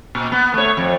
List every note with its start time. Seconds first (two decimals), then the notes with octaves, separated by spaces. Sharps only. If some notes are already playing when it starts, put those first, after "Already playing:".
0.15 A#2
0.32 B3
0.54 A3 C#5
0.77 F2